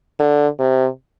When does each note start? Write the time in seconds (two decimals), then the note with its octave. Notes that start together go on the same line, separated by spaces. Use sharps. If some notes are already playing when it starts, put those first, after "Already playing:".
0.20 D3
0.59 C3